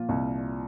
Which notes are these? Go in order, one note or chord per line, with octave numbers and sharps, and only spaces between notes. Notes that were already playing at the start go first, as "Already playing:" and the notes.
Already playing: A#2 F3 F4
C2